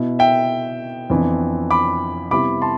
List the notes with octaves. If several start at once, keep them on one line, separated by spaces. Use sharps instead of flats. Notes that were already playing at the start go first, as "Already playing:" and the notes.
Already playing: B2 B3 E4
E5 G5
F2 E3 B3 D4
B5 D6
C3 G3 B3 E4 B5 D6
A5 C6